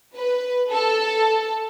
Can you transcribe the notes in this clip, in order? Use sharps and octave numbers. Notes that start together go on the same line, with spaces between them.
B4
A4